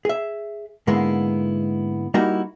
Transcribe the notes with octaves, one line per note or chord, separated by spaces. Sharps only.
G#4 E5
G#2 D3 G#3 A#3 B3 E4
G3 A#3 D#4 E4 F#4